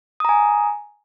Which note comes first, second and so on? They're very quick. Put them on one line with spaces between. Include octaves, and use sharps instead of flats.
D#6 A#5 G#5